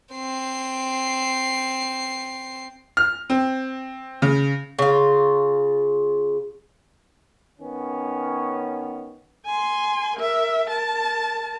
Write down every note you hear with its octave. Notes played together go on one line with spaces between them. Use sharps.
C4 C7
F6
C4
C#3
C#3 F4
D#3 B3 C#4
G#5 C6
A#4 E5
A#4 A5